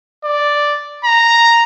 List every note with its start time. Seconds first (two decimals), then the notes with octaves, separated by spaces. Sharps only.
0.25 D5
1.05 A#5